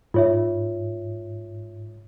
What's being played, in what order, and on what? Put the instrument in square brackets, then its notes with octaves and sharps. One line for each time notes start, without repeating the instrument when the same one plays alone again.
[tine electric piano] G#2 [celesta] F4 C#5 E5